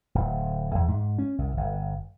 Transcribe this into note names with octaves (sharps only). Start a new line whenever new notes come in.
D1
E2
G#2
C#4
C2
G1